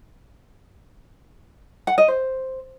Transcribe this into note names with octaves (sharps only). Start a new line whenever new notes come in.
F#5
D#5
C5